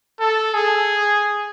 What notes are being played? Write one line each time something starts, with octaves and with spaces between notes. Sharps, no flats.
A4
G#4